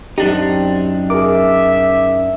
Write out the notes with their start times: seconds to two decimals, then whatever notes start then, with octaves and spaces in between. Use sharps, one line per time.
0.18 F#2 C4 D4 D#4 G4
1.10 G#4 A#4 E5 D6